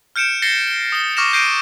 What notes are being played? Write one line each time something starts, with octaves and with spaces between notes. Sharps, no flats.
F6 G6 C#7 D7 E7
A6 A#6 C7 C#7 G7
G7
D#6 G7
C#6 D6 F6 A#6 E7
D6 G6 A#6 C7 D7 D#7